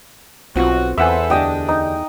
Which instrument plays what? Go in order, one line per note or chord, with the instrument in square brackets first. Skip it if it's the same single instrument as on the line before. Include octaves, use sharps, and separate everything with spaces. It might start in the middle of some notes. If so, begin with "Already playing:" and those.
[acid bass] B1 [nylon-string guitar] C4 F4 [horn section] F#4
[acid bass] E2 [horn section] A4 B4 C5 [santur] E5 F#5 G#5
[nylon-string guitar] D2 G4 [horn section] D4 [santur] D#5 G5
[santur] D#4